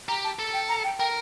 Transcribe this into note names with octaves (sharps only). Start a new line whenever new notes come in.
G4 A#5
A5
A4
G5
A#5
G5
A#4 G5